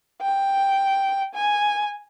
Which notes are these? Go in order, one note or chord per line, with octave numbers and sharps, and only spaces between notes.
G5
G#5